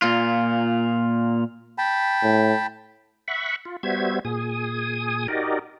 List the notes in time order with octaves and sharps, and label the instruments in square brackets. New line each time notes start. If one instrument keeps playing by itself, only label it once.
[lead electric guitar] A#2 F4
[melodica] G5 A5 B5
[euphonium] A2
[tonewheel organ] E5 F#5 B5 C#6
F4
G3 B3 F#4 C5 E5 G#6
A#2 G#4 G#5 D#6
D#4 F#4 G4 A#4 D5 D#5